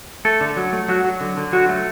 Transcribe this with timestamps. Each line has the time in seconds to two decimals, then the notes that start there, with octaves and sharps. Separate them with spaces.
0.25 A3 A4
0.41 D3
0.57 F#3
0.73 A3
0.88 F#3 F#4
1.04 F#3
1.21 D3
1.37 D3
1.53 F#3 F#4
1.69 A3